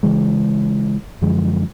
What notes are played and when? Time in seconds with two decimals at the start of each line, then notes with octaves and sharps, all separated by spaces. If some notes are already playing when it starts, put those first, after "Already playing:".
0.03 C#3 E3 G#3
1.22 F#2 D3 F3 G#3